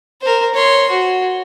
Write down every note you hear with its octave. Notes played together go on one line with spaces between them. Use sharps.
A#4 C5
C#5 C6
F#4